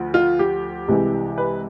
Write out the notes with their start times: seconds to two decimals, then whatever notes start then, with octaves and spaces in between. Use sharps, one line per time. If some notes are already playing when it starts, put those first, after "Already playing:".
Already playing: D2 F3
0.14 F4
0.39 G4
0.88 C2 C3 E3 G#3
1.38 B4